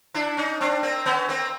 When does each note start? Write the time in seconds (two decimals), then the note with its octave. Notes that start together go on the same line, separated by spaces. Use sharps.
0.14 D4 E4
0.37 C#4 D#4
0.61 C4 D4
0.83 A#3 C4
1.06 B3 C#4
1.29 A#3 C4